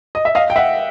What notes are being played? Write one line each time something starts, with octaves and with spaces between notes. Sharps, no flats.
D#5
E5
D#5 F5
G5
E5 F#5